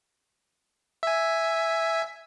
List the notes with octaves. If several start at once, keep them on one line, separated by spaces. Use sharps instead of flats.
E5 G#5